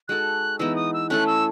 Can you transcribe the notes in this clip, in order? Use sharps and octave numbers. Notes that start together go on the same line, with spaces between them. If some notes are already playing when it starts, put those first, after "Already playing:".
G#3 D#4 F#4 A4 F#6
E3 G#3 B3 D#4 E6
D#6
E6
A3 C#4 E4 A4 F#6
E6